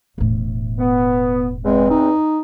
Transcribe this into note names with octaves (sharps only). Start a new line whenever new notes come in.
E1 A2
B3
E2 G#3 C4
D#4